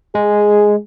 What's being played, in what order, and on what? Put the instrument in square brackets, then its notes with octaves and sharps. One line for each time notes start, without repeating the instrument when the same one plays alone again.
[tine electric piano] G#3 [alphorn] G#4